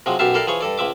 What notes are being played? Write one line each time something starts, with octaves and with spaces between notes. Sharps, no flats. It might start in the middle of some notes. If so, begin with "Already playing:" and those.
C3 F3 F#3 G#3
B1 F#2 G4 E5 F5 A5
E4 G4 A4 A#4 D5 F5
E3 F3 G#4 C#5
G2 A4 D5
C#2 F3 E5 D6